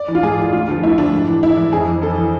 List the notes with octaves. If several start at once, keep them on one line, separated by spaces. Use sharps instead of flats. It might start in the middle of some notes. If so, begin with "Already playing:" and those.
Already playing: D5
E3
F4
G#2 G#4
E3 G#4
D2 F4
D3 F3
D2 E4
D3 F3 D4
G#2
E3
G#2 E4
E3
F2 G#4
E3
F2 A4
E3